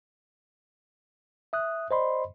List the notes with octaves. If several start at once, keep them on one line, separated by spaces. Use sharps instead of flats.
E5 D#6 F#6
C5 D5 D#5 B5 C6